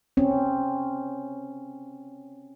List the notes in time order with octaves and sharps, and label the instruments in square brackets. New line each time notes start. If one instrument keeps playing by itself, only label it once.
[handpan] C4 C#4